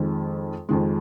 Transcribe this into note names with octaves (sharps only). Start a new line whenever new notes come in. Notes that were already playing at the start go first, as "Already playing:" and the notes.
Already playing: F2 D#3 G#3
F2 D#3 G#3